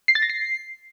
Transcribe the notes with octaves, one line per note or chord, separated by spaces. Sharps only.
C7
A6
A#6
C7